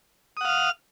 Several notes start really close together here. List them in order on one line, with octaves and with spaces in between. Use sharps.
D#6 F#5 F5 F6